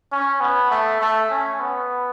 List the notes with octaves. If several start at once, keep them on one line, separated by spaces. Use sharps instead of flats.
C#4
B3
A3
A3
C#4
B3